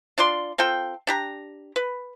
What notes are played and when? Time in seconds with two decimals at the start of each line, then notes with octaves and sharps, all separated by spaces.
0.18 D4 F4 D5 C6
0.58 C4 F4 A4 G5
1.07 D4 G4 A#5
1.76 B4